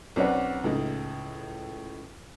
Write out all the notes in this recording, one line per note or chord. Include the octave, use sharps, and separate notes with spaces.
B1 C4 C#4 B4 D5 F#5
C#2 A2 D#4